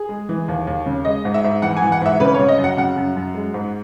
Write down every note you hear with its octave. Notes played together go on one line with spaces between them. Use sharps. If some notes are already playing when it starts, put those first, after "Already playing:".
Already playing: G#4
G#3
E3
D#2
D#2
C#3
G#3 D#5
G#2
E5
G#2
E3 F#5
G#5
E3
F#5
G#2 E5
C#3 B4
C#3 C#5
D#5
F#2
F#5
C#3 F#5
F#2
F#2
G#3
G#2